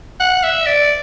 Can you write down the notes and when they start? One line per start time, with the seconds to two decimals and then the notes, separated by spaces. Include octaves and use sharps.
0.20 F#5
0.43 E5
0.66 D5